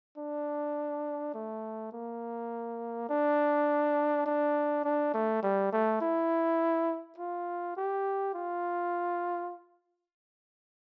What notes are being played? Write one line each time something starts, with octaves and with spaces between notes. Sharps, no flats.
D4
A3
A#3
D4
D4
D4
A3
G3
A3
E4
F4
G4
F4